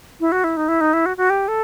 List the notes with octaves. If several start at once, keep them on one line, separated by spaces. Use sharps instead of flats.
E4
F#4
E4
D#4
E4
D#4
E4
F#4
F#4
G4
A4